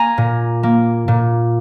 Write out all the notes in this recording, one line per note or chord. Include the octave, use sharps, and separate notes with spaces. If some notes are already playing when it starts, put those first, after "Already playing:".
Already playing: A#3 G#5 A#5
A#2
A#3
A#2